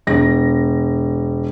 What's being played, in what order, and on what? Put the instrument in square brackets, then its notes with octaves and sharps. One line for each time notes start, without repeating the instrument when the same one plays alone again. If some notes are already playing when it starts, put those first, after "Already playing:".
[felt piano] E1 A#6